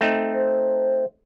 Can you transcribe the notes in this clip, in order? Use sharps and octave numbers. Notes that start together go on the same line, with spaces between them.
A3 C4 D#4
C5